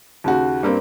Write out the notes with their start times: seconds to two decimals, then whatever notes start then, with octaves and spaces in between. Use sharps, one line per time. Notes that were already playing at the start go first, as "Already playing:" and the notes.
0.24 D#2 C#3 F#4
0.63 G2 A#3 C4